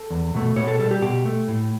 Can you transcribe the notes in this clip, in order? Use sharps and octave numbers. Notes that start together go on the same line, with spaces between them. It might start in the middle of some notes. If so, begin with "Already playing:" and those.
Already playing: A4
E2
B2 A3
B2 C#5
A4
G3 A4
G4
B2 G4
A3
A2